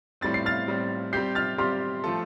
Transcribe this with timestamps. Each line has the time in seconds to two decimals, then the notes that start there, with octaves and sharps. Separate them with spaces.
0.21 A2 G3 C4 A6
0.34 C7
0.46 F6 A6
0.68 A2 G3 C4
1.13 G3 C4 G4 G6 C7
1.35 F6 A6
1.58 G3 C4 G4 C6 F6
2.04 F3 A3 F4 A4